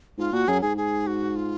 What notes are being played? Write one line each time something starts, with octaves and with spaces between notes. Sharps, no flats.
G#2 F4
A#2 F#4
F#2 G#4
G#2 G#4
G#4
F#4
F4